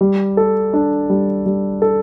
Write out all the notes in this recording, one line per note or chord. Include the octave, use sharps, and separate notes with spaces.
G3
A4
D4
G3
G3
A4